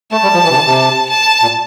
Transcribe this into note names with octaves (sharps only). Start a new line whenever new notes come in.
A3 A5
G3
F3
E3
C3
D3
C3
A5
A#2